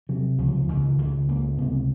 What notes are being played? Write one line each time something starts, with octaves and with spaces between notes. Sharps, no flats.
C3 F#3
C#2 F3
F#3
F3
C#2 D#3
D#3
C#2 D#3
C#2 A#3
C3 B3